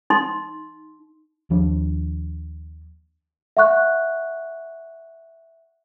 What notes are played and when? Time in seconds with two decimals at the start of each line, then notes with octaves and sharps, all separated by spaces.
0.10 D#4 C6
1.50 D#2 F3 D4
3.57 E5 F#5 C#6 F#6